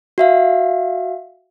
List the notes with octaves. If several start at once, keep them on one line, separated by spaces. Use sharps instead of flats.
F#4 E5 F5